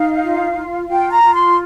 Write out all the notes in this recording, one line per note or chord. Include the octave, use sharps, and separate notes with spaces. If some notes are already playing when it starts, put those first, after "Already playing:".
Already playing: D#4 F5
F4
F4
F4 G5
A#5
F4
C6